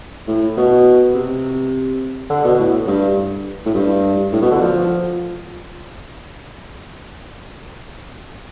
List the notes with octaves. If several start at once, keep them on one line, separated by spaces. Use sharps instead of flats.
A2
B2
C3
D3
B2
A2
G2
A2
G2
A2
B2
D3
F3